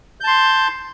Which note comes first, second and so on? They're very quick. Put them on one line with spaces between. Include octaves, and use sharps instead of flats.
G6 A5 C6